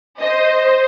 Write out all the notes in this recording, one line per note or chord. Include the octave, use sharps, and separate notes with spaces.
C5 D#5